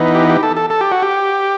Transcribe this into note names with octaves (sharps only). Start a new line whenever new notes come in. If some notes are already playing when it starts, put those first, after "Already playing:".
Already playing: E3 B3 D#4
G4
G4
A4
A4
A4
G4
F#4
G4